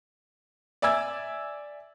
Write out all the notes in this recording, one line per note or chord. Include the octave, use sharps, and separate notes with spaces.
D5 E5 G#5 D6 E6 G#6